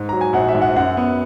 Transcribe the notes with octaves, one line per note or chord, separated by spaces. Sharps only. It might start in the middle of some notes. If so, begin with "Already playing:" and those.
Already playing: G#2
F#3 A#5
G#5
A#1 F#5
E5
G#2
F#5
F#2 F#5
B3